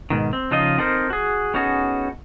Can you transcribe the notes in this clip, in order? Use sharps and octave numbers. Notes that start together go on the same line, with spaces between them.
G#2 B2 D#3
C4
C#3 F3 D#4 F4 D#5
C4 D#4 A4 A#4 C5
F#4 G#4
B3 C#4 D#4 F#4 G#4 A4